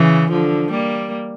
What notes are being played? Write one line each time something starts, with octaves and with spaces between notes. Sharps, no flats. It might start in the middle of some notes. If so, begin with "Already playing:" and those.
Already playing: C#3 E3
D3 F3
G3 A#3